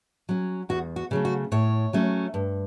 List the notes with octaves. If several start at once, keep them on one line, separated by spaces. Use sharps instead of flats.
F#3 C#4
E2 F#4
F#4
C#3 F#3 A3
F#4
A2 C#5
F#3 A3 C#4
G2